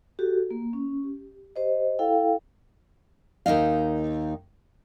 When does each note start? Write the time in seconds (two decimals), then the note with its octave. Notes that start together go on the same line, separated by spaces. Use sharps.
0.19 F#4 G4 A4
0.51 A#3
0.73 C#4
1.04 G4
1.56 G4 C5 D#5
1.99 E4 A4 F5 G5
3.46 D#2 D#4 D#5 F5